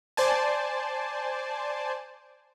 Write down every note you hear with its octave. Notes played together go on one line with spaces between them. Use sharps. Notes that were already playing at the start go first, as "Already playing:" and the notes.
C5 D5 G#5 A5